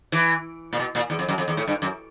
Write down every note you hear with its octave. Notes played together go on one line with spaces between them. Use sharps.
E3
A#2
B2
A#2
E2
F2
F#2
F2
E2
A2
G2
F#2